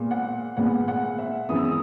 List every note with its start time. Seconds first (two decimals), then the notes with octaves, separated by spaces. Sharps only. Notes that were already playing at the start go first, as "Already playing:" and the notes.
Already playing: A#2 G#3 B3
0.11 F#5
0.57 A#2 G#3 B3 F#5
0.88 F#5
1.18 E5
1.49 F#2 E3 G#3 B3 D#6
1.58 E6
1.65 D#6